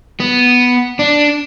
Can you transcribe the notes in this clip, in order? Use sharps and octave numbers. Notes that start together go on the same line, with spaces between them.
B3
D4